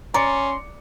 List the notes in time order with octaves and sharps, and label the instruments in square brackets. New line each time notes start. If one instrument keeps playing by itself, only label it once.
[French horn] C#4 [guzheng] D5 [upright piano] A#5 C#7 [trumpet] C6